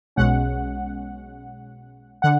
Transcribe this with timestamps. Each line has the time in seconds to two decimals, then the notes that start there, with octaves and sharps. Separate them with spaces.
0.16 B1 B2 G#3 C#4 F#5
2.22 D3 F#5